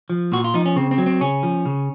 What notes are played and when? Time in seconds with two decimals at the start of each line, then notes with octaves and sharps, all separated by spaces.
0.10 F3
0.32 A#2 F#4
0.44 F4
0.54 F3 D#4
0.66 C#4
0.76 C#3 C4
0.91 C4
0.98 F#3
1.06 C4
1.21 C#3 C#4
1.43 F3
1.66 C#3